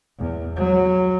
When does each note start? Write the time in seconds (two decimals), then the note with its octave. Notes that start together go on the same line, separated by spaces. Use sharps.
0.19 E2
0.56 F#3